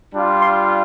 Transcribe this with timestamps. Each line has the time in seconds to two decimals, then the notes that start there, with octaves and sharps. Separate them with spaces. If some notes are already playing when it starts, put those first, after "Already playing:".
0.14 G3 D4 F4
0.42 C6